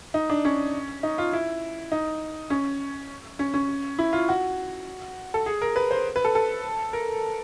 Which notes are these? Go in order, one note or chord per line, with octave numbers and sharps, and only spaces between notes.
D#4
D4
C#4
D#4
F4
E4
D#4
C#4
C#4
C#4
E4
F4
F#4
A4
G#4
A#4
B4
C5
B4
A4
A4
A#4